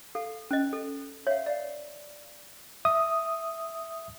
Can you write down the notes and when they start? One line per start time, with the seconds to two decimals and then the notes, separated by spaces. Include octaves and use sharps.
0.15 A4 F5
0.51 C#4 D#5 F#6
0.73 A4
1.27 C#5 E5 F5
1.46 D5 F5
2.85 E5 D#6